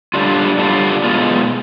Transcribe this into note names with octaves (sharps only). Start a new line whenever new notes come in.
D3 G3 D4 F4
D3 G3 D4 F4
B2 G#3 B3 F4